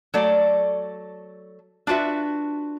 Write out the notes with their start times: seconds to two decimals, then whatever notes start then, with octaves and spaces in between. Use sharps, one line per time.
0.14 F#3 A3 A4 D5
1.87 D4 F4 F#4 B4 E5